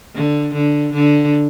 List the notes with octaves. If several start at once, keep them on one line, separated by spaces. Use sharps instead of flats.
D3
D3
D3